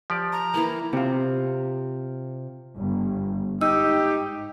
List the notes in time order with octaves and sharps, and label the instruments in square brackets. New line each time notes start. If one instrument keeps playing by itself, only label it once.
[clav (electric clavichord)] F3 G4 D5
[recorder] A#5
[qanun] E3 A#3 [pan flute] E4
[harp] C3 F4
[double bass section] G1
[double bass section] G#2 [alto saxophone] D#4 [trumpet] G4 [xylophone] E6